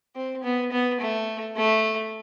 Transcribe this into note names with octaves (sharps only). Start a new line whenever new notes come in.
C4
B3
B3
A3
A3